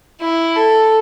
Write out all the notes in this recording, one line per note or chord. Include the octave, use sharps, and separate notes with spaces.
E4
A4